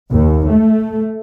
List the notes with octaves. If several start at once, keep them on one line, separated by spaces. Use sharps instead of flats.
D#2
A3